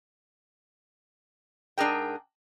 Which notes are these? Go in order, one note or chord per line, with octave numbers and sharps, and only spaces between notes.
G#2 D4 G#4 A#4 G5